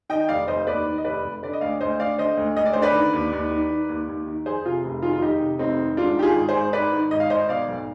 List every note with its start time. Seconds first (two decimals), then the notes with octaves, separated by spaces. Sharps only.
0.09 D#3 D#5 G5
0.29 F1 D5 F5
0.48 F1 C5 D#5
0.67 D#2 B4 D5
0.86 D#3
0.98 D#5
1.04 F1 B4 D5
1.24 F1
1.43 D3 B4 D5
1.53 D#5
1.61 D2 D5 F5
1.81 D2 C5 D#5
2.00 D3 D5 F5
2.18 D3 C5 D#5
2.37 D2
2.56 D2 D#5
2.66 D5
2.73 D3 C5
2.82 B4 D5
2.94 D#3
3.13 D#2
3.33 D#2
3.51 D#3
3.70 D#3
3.89 D#2
4.09 D#2
4.27 D#3
4.46 F2 G#4 C5
4.65 C3 F4 G#4
4.85 F1
5.02 D#3 F4 G#4
5.13 F4
5.22 F2 D#4 G4
5.42 C3
5.59 F1 C4 D#4
5.79 D#3
5.97 G#2 D4 F4
6.16 D#3 G4
6.23 F4 G#4
6.35 G#1
6.49 G#4 C5
6.55 G#1
6.73 G#2 B4 D5
6.93 D#3
7.11 G#1 D#5
7.20 F5
7.30 G#1 C5 D#5
7.49 B2 D5 F5
7.68 B1